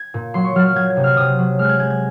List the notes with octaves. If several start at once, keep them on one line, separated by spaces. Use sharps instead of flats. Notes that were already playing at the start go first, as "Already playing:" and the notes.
Already playing: G#6
A#2
F#3 C6
C#6
F#3 F6
F6
F#3 G#6
G#6
C3
F6
C3 D#6
F#3
G#3 F6
F#6 G#6
G#3 G#6
G#6